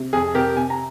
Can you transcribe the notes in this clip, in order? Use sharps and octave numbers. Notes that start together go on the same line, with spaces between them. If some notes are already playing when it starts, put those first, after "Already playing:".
Already playing: C3
F2 G#4
C3 G4 A#4
C3 G#5
A#5